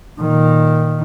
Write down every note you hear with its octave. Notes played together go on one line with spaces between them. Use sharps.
A#2 D#3